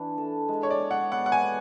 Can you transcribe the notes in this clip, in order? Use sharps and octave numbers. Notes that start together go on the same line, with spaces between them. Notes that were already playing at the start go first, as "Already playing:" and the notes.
Already playing: E3 D4 E4
A4
G#3
C#5
D5
G#4
F#5
B3 F#5
F#5
G#5
B3